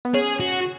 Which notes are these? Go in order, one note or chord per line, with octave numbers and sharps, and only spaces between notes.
B3
C#4 G#4
F#4